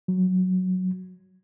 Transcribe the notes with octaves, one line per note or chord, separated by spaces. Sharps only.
F#3